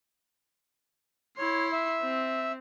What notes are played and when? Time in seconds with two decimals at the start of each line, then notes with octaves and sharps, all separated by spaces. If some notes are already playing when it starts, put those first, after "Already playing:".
1.38 E4 C#5 C6
1.72 E5
2.02 C4